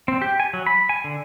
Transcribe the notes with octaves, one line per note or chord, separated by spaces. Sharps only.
C4
G4
G#5
F#3
B5
G#5
D3